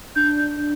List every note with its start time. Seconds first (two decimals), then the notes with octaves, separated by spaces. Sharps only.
0.16 D4 G6